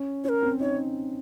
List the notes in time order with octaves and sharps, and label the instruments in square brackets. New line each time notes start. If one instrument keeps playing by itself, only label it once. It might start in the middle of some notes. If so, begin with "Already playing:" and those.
Already playing: [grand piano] C#4
[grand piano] C#4 [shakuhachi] A#4 C#5
[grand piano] C4
[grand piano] D#4 [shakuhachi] C#5